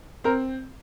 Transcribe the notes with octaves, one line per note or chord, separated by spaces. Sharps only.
C4 A#4